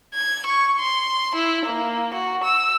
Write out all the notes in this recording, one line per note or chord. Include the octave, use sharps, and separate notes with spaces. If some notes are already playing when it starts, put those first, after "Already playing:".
G#6
C#6
C6
E4
A#3
F#4
E6